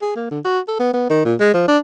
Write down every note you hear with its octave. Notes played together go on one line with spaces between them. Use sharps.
G#4
A#3
D3
F#4
A4
B3
B3
D#3
A#2
G#3
F3
D4